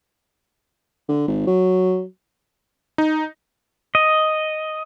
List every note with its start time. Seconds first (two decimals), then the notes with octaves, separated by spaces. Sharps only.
1.09 D3
1.28 G#1
1.46 F#3
2.98 D#4
3.95 D#5